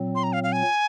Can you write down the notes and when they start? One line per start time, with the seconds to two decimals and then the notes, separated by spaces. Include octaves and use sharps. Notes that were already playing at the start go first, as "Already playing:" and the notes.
Already playing: A#2 F#3 C4
0.15 C6
0.23 A#5
0.33 F5
0.43 F5
0.52 G#5